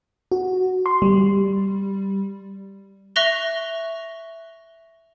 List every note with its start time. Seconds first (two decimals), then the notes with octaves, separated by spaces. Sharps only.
0.32 F#4
0.86 C6
1.02 G3
3.16 E5 C#6 F#6 A#6 F7 G7